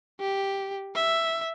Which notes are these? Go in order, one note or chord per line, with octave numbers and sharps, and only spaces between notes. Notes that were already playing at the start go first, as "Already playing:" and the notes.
G4
E5